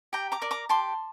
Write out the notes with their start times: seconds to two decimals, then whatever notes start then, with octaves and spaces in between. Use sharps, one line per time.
0.13 G4 G5 A#5
0.32 A#5 D6
0.42 A#4 D5
0.51 A#5 D6
0.69 G4 A5 C6